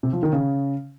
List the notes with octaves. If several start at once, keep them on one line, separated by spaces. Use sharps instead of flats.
C3
F3
D#3
C#3